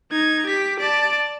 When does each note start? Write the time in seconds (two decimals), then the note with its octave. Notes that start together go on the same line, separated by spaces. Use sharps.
0.12 D#4 G#6
0.47 G4 B6
0.80 D5 A5